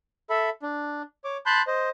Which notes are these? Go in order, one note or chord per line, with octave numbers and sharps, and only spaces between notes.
A4 E5 B5
D4
C#5 D6
A5 B5 C6 F#6 G6
C5 D#5